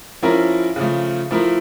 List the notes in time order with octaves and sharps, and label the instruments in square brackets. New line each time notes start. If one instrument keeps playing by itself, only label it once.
[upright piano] F3 C#4 E4 A#4
C#3 F3 A3
F3 A3 E4 A#4